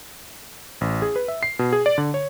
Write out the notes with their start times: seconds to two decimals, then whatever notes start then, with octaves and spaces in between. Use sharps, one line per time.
0.81 A1
1.02 G#4
1.16 B4
1.28 E5
1.43 C7
1.59 B2
1.73 G#4
1.86 D5
1.98 D3
2.14 C#5